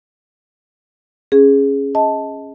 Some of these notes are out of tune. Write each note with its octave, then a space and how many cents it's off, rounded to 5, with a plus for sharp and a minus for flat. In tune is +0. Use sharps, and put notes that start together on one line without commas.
C#4 -10 G#4 +0
D#5 +25 A5 +0